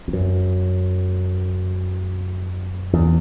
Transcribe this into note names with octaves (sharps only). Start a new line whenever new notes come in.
E2
F#2
E2